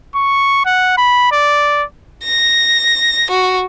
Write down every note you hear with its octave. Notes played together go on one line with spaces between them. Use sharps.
C#6
F#5
B5
D5
A#6
F#4